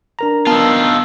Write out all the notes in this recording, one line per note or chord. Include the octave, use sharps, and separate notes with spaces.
D4 A#4 A#5
D#3 B3 F4 A5 E6